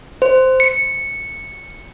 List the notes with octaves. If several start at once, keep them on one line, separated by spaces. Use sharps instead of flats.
C5
C#7